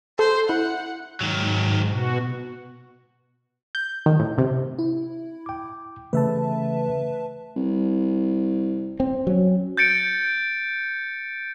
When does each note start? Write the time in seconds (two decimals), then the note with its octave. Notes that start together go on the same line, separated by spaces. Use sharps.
0.19 A4 C5
0.49 E4 F#5
1.21 G#2 D#3 F#3
1.87 B2 F#4
3.75 G6
4.06 D#3
4.20 A2
4.38 C3
4.79 E4
5.46 G5 D6
6.13 C#3 E3 A3 B4 E5 A5
7.56 C2
9.00 C4
9.27 F#3 C#4
9.77 G6 A6 C#7 D7